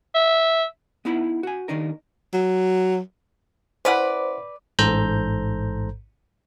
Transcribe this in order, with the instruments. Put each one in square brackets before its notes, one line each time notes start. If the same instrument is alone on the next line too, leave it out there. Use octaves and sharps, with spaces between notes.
[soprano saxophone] E5
[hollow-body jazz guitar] B3 D#4 E4 F#5 B5
F#4 G#5
D#2 D#3 D4 D#4 A#4
[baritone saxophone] F#3
[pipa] C#4 E4 F#5 [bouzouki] B4 D5 [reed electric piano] C5
[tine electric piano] A1 G#2 A4 C5 A#5 G6